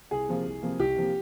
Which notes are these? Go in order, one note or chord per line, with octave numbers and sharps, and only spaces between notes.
C2 G#4
C3 F3 A#3
C2
C3 F3 A#3
C2 G4
C3 F3 A#3